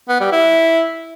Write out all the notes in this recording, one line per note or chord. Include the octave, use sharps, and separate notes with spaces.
B3
G3
E4